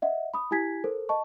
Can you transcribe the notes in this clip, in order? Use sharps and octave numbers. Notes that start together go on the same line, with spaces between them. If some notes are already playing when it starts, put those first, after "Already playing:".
D#5 E5 F#5
B5 D#6
E4 G4 G#5 G#6 B6
A4 A#4 C5
D#5 A5 C#6